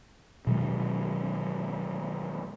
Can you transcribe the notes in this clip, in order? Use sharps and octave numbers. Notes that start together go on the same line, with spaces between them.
B2 D#3 F#3 G#3